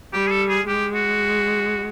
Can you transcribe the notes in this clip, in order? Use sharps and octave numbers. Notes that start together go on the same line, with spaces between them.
G3 G4
G#4
A4
G#4
G#3 G4
F#4